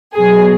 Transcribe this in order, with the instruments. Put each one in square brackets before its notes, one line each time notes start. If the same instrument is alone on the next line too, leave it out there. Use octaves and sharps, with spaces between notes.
[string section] B2 F#3 G#4